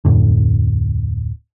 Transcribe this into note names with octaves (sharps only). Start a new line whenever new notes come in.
D1 F2 A2 D3